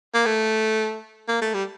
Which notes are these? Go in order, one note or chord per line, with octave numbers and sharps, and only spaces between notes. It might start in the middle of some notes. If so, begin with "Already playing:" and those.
A#3
A3
A#3
A3
G3